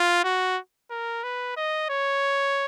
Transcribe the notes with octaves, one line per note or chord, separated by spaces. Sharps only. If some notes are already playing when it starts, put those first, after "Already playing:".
Already playing: F4
F#4
A#4
B4
D#5
C#5